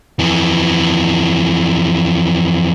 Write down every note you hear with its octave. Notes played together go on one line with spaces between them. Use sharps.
F2 E3